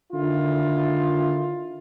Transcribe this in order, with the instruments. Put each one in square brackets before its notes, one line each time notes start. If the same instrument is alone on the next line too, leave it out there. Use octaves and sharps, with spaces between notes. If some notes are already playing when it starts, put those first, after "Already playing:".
[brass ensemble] D3 D#3 E4 F4